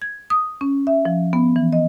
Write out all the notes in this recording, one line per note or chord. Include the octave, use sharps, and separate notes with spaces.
G#6
D#6
C#4
E5
F3
B3
E3
D#5